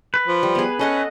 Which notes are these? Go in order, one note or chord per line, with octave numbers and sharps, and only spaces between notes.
B4
F3
G3
B3 G#4
C#4 A4 D#5 F#5